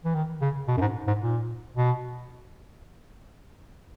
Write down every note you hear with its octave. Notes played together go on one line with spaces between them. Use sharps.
E3
D#3
C#3
B2
F#2
G#2
G#2
A#2
B2